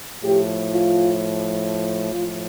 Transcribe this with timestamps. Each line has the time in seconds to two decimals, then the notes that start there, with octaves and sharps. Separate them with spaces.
0.24 A2 F3 G4
0.70 F4
2.12 A2 F3 F4